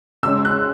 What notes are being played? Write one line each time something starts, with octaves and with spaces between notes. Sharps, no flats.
C#3 G#3 C#4 E6
F#6